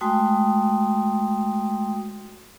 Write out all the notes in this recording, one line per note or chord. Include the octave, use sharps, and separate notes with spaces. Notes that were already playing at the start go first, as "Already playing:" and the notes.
G#3 A3 F#4 G5 C6 D#6